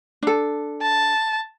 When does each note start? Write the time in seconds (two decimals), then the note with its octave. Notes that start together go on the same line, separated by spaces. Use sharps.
0.22 D4 A4
0.82 A5